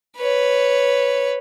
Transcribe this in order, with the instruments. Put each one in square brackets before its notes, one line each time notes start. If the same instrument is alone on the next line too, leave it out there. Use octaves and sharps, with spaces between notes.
[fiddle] B4 C#5